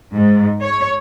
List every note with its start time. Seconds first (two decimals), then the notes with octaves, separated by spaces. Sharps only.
0.14 G#2
0.63 C#5